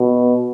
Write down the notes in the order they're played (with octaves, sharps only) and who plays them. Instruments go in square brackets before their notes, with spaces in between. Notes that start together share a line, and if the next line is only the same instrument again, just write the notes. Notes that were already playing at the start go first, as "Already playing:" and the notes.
Already playing: [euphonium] B2